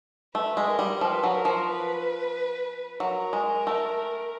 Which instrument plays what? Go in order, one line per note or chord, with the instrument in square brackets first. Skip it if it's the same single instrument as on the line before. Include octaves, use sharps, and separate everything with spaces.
[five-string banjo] A3 [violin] B4
[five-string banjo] G#3
[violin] A#4
[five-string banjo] G3
[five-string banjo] F3 [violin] B4
[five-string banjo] F#3
[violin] A#4
[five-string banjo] F3
[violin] B4
[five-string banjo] F#3 [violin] A#4
[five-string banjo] G#3
A3